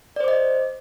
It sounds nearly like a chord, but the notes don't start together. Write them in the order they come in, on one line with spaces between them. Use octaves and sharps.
D5 C5 D6 D#5